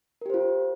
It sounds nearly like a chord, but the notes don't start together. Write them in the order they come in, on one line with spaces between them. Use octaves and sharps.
A#4 G4 C5 F4